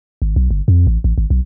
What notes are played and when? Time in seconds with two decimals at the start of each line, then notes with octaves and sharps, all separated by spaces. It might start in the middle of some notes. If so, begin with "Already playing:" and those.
0.22 G#1
0.36 B1
0.51 G1
0.68 F2
0.87 A1
1.04 A1
1.18 G#1
1.30 B1